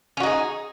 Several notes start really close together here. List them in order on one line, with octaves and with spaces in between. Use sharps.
C#4 F#4 D#4 G#4